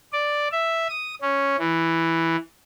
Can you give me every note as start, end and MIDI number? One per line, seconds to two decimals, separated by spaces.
0.13 0.48 74
0.52 0.87 76
0.89 1.14 87
1.22 1.56 61
1.59 2.36 52